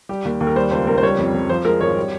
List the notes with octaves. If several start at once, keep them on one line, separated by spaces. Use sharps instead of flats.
G3 G4
D#2
D#2
A#4
G3 C5
C#2 C5
C#2 A#4
C5
G3 C#5
F2
F2
F3 C5
G#3 A#4
G#1 C#5
G3